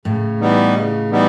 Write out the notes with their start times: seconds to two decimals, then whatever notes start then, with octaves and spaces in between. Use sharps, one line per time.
0.05 A2 C#3
0.40 E3 G3 B3 D#4
0.75 C#3
1.10 E3 G3 B3 D#4